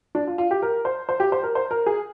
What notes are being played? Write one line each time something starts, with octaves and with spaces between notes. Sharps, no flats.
D4
F4
F4
G4
A#4
C5
C5
G4
C5
A#4
C5
A#4
G#4